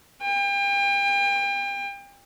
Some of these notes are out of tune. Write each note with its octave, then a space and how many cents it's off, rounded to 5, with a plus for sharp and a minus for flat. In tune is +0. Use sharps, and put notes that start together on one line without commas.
G5 +35